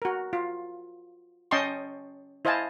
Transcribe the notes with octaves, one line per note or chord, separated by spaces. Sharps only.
F#4 A#4
F4
C#4 D#5 G5 A5 C6 C#6
E4 C5 D#5 F5 G#5 A5